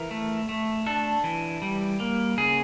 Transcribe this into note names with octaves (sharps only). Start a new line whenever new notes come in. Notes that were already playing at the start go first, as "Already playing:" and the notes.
Already playing: E3 A#4
A3
A3
D4 A4
E3
G3
A#3
C#3 G#4